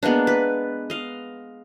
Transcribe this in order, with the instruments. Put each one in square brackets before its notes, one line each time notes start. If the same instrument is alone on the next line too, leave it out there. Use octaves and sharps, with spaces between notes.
[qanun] G#3 A#3 B3 D4
B4
D#5 F5